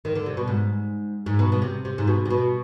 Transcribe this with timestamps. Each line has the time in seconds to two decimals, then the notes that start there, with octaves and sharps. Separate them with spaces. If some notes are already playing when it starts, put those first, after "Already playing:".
0.05 D#3
0.15 D3
0.26 C3
0.37 B2
0.47 G#2
1.26 G#2
1.39 B2
1.52 B2
1.62 C3
1.85 C3
1.98 G#2
2.07 B2
2.25 C3
2.30 B2